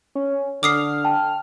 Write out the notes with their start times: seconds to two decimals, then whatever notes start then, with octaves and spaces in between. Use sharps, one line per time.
0.15 C#4
0.63 D3 D6 D#6 F6 C7
1.04 G5 A5